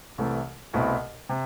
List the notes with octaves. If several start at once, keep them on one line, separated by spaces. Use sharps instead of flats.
C2 C3 E3 A3
C2 B2 A3 C4 E4
C3